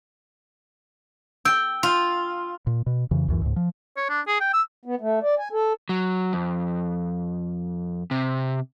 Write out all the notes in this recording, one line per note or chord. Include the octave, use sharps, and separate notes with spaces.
G5 E6
F4
A#2
B2
F2 C#3 E3
C#2 F#2 E3
C#2 G#2
F3
C#5
D4
G#4
G5
E6
B3
A3
D5
G#5
A4
F#3
F2
C3